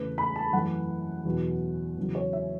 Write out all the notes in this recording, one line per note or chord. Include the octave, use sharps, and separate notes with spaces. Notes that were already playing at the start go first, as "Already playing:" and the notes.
Already playing: E2 C#3 A3 B4
B5
A5
F#2 E3 A3 F#5
E2 B2 F#3
E2 C#3 F#3
C#5
E5